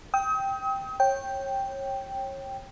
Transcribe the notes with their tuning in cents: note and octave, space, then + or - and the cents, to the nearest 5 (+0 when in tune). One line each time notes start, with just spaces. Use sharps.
G5 +0 D#6 +40
C#5 -25 G5 +0